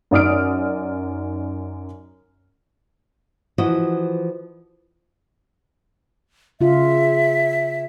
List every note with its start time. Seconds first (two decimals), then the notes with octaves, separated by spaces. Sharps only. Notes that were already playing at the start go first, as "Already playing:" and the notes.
0.11 F#2 D#4 D5 D#6 F6 D7
3.58 E3 F3 F#4 D#5
6.61 C#3 F4 E5